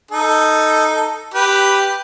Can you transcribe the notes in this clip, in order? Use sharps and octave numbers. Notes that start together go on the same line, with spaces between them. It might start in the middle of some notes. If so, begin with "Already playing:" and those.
D#4 A4
G4 B4